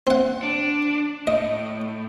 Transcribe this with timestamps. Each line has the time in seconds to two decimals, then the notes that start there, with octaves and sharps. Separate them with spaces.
0.07 C4 F#5
0.43 D4
1.27 A2 D#5